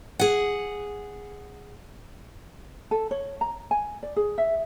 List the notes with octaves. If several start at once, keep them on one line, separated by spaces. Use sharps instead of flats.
G#4 F#5
A4
C#5
A#5
G#5
D5
G#4
E5